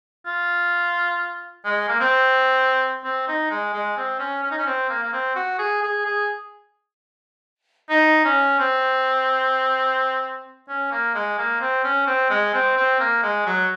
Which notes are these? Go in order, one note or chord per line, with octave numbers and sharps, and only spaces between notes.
F4
G#3
A#3
C4
C4
D#4
G#3
G#3
C4
C#4
C#4
D#4
C#4
C4
A#3
A#3
C4
F#4
G#4
G#4
G#4
D#4
C#4
C4
C#4
A#3
G#3
A#3
C4
C#4
C4
G#3
C4
C4
A#3
G#3
F#3